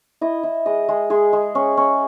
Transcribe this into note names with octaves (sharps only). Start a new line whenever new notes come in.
E4 D#5
E4
G#3 D#5
G#3
G#3 G#4
G#3
C#4
C#4